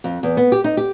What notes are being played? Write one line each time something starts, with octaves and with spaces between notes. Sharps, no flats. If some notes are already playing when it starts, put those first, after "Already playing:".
F2
E2
B3
G4
D#4
G4